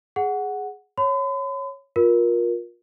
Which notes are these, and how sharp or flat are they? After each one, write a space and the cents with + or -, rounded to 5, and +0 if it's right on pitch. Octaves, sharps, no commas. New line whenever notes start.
G#4 +0 F#5 +0
C#5 -10 B5 +45
F4 +25 A#4 +25